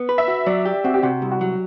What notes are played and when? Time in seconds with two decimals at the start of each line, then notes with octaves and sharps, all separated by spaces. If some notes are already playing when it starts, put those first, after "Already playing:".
Already playing: B3
0.09 B4
0.18 E5
0.28 F#4
0.46 F#3 D5
0.65 G4
0.84 C4 F#4
0.94 G4
1.03 C3 F#4
1.22 C2
1.32 F#4
1.41 F#3